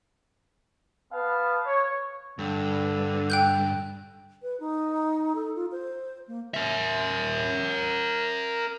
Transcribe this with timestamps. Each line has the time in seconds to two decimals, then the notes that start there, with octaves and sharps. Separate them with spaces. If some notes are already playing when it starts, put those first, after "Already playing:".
1.12 B3 B4 F5 A5
1.65 C#5
2.39 G2 D3
3.30 G5 F#6 G6
4.42 B4
4.60 D#4
5.35 A4
5.55 F4
5.72 C5
6.28 A#3
6.54 A#4 E5